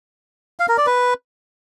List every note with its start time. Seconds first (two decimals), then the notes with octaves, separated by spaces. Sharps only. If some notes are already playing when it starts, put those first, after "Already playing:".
0.60 F5
0.68 A#4
0.77 D5
0.86 B4